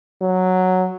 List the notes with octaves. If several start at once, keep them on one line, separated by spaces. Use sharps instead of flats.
F#3